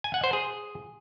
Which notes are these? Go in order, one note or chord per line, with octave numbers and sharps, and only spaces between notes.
G#5
F#5
C5
G#4